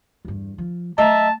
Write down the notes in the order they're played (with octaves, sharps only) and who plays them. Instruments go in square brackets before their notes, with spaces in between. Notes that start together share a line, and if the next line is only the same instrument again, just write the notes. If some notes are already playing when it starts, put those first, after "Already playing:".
[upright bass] E2 G2
F3
[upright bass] F#3 A3 [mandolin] D#5 E5 A#5 [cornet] A5